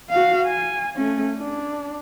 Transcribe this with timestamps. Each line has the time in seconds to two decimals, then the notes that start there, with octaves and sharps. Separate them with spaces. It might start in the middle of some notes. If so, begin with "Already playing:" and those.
0.10 F#4 F5
0.48 G#5
0.96 A3 C#4
1.37 D4